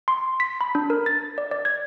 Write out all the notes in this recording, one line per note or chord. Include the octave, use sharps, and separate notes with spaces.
C6
B6
B5
D4
A#4
A6
D5
D5
G#6